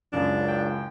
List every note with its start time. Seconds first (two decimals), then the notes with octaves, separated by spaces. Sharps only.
0.13 F#1 C#2 F#2 D4 F5
0.48 G5